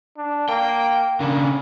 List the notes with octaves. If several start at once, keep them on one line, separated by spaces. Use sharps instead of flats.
D4
A#3 G5
C#3 A#3 D4